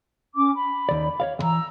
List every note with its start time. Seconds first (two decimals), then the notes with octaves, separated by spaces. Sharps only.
0.35 C#4 D6
0.55 B5
0.89 D#2 D5
1.20 C#5 D5 F5
1.39 D#2 E3 A#5 E6